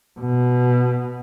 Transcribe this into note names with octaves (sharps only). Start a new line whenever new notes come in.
B2